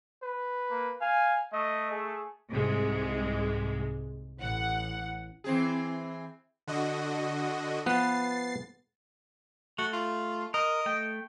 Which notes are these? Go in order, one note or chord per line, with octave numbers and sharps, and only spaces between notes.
B4
A#3
F5 G#5
A3 D#5
G#4
C2 G#2 C3 G#3
A1 F#5
E3 C4 G#4
D3 F#4 D#5
F3 B3 B4 A6 C7
A3 F#4
F4
A#4 D#5
A3 G5